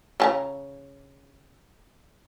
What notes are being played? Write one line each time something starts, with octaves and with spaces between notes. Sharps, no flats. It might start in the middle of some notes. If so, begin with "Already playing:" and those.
C#3 A5 A#5